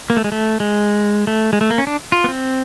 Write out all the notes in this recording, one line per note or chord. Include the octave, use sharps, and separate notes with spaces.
A#3
A3
G#3
A3
G#3
A3
G#3
A3
A#3
C#4
D4
F4
B3
C4